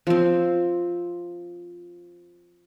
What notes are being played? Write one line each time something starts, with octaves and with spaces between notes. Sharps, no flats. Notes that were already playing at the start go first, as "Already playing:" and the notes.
F3 C4